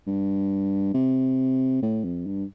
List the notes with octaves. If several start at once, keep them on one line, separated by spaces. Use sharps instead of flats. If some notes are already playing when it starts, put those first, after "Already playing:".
G2
C3
A2
F2
G2